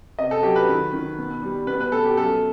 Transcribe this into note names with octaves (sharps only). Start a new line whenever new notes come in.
C3 D#5
A4
F#3 G4
B4
D#3
D#3
B2
G3
B2 B4
B4
B2 A4
G4
F#2 A4